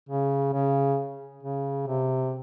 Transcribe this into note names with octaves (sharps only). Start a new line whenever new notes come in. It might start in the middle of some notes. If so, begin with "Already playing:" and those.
C#3
C#3
C#3
C3